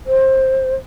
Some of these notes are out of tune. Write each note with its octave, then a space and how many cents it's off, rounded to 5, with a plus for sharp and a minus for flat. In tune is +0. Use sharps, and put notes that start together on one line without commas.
C5 +20